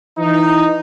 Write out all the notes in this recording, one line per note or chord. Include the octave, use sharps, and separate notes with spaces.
E3 D#4